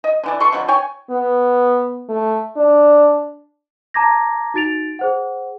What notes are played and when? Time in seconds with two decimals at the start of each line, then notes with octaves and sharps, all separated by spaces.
0.04 D#5
0.24 D3 E3 D5
0.40 A3 A4 C6 C#6
0.52 B2 D3 F3 F#3
0.68 C#5 G5 G#5
1.10 B3
2.09 A3
2.57 D4
3.94 A5 A#5 D6 G#6 A#6
4.54 D#4 F#4 A6 D7 F7
4.99 G#4 C5 F#5